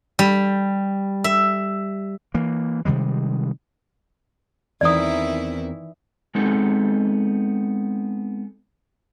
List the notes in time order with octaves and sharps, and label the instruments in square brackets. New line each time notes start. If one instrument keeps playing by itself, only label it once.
[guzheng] G3
E5
[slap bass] E3 A#3
C3 D#3 G3 G#3
[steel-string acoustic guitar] E2 C4 A#4 [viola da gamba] D#3 E3 E4 [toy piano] D5 D#6
[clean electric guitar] G#3 B3 C4 D#4 A4